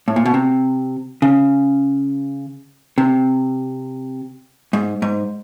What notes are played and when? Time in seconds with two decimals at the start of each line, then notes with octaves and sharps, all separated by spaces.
0.08 A2
0.16 A#2
0.26 B2
0.34 C3
1.22 C#3
2.98 C3
4.73 G#2
5.02 G#2